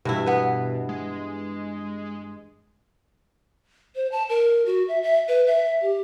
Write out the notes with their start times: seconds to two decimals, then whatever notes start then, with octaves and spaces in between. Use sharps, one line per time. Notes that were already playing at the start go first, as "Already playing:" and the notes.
0.05 G2 B2 E3 E4
0.26 B3 B4
0.89 G#3
3.96 C5
4.12 A5
4.29 A#4
4.66 F#4
4.88 E5
5.02 E5
5.28 B4
5.47 E5
5.82 G4